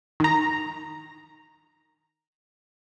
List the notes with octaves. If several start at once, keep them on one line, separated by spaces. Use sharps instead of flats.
D#3 A#5